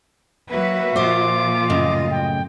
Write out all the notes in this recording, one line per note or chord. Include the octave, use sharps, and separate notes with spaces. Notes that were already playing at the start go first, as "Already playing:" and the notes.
F#3 A#3 F#4 B4 E5
A#2 F3 F4 C5 D#5 D6
F#2 A2 C#3 D#5
G5